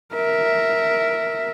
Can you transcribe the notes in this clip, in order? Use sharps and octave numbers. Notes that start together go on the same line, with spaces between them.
A#4 E5